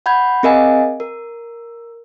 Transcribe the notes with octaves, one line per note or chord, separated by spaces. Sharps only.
F#5 B5 G6 G#6
C4 G#4 A#4 D#5 F5 G#5
A#4